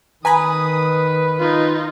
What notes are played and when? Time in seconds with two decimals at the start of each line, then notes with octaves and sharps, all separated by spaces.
0.25 D#3 B4 G#5 A#5 B5 D#6
1.40 D#4 F4